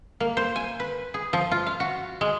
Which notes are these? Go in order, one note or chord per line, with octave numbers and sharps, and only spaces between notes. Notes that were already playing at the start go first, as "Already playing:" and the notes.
A#3
C5
G#5
B4
G#4
F3
F4
F5
F#4
G#3